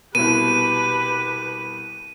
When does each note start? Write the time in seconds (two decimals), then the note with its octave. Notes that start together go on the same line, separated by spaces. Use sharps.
0.15 C2 B2 G4 B4 D#7